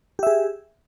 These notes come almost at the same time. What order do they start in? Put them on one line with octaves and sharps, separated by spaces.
G4 E5 G#4